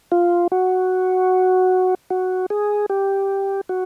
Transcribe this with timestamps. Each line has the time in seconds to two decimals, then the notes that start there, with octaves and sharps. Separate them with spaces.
0.12 F4
0.52 F#4
2.10 F#4
2.50 G#4
2.90 G4
3.69 F#4